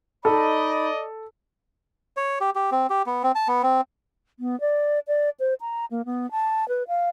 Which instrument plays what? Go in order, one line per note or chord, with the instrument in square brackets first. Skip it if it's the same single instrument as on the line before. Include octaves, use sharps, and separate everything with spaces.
[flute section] D#4 B5 [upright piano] A4 [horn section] D5 D#5
[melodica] C#5
G4
G4
C4
G4
B3
C4
A5
B3
C4
[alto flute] B3
D5
D5
C5
A#5
A#3
B3
A5
B4
F5